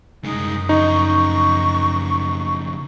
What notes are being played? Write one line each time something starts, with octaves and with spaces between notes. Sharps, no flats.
C2 F#2 G#3 D#4
F2 C#3 D#4 C#6